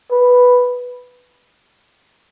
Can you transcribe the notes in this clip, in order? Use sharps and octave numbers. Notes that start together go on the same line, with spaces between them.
B4